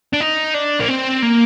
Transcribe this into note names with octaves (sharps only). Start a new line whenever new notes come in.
D4
D#4
D4
A#3
C4
A#3